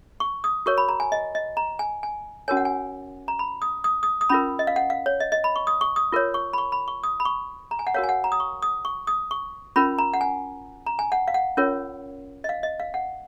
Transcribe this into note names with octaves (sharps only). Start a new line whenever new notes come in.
C#6
D#6
F#4 A#4 C#5 C#6
B5
A#5
G#5
D#5
D#5
A#5
G#5
G#5
C#4 F#4 A#4 C#5 G#5
F#5
G#5
A#5
B5
D#6
D#6
D#6
D#6
C#4 F4 A#4 B5
D#5
F5
F#5
F5
C#5
D#5
D#5
B5
C#6
D#6
C#6
D#6
F4 A#4 C#5
C#6
B5
C#6
B5
C#6
D#6
B5
C#6
A#5
G#5
F#5
F#4 A#4 C#5 F5
G#5
F#5
A#5
D#6
C#6
D#6
C#6
D#6
C#6
C#4 F4 A#4 B5
A#5
F#5
G#5
A#5
G#5
F#5
F5
F#5
C#4 F4 A#4 C#5
D#5
F5
D#5
F5
F#5